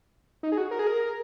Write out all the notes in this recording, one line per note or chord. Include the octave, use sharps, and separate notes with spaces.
D#4
G#4
F#4
A#4
G#4
A#4